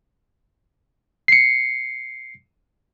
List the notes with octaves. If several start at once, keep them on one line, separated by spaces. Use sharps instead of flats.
C7 C#7